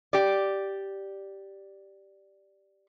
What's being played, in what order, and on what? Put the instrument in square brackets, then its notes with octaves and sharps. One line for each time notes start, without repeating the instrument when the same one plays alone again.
[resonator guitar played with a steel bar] G4 D5